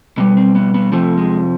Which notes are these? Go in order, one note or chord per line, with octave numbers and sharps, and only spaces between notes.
B2 G3 B3
C4
B3
B3
F2 C3 F3 A3
G#3